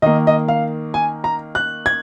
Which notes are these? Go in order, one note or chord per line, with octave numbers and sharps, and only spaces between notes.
D#3 A#3 D#5
D#5
F5
G#5
A#5
F#6
G#6